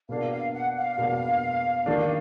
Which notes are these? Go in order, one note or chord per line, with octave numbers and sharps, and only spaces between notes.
B2 A#3 D4 F#4 F5
F5
F#5
F5
B2 A#3 D4 F#4
D#3 A#3 D4